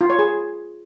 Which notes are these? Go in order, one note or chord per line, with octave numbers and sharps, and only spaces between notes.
F4
C#5
G#4